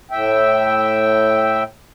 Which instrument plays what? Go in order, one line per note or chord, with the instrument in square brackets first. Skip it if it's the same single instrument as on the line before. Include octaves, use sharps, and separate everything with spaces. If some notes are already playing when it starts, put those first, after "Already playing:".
[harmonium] A2 E5 G5